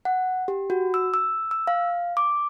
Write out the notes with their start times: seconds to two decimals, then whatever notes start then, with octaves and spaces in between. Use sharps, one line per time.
0.05 F#5
0.48 G4
0.70 F#4
0.94 E6
1.14 E6
1.51 E6
1.67 F5
2.17 D6